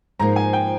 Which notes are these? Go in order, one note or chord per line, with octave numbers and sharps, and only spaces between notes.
G#2 F3 A#3 A#5
G#5
G5